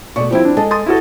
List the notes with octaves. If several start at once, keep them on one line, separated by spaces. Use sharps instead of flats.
B2 A3 D5 C#6
F3 G3 C4 E4
D4
G#3 A4 D#5 A5
C6 D#6 A6
E4 F#4 A4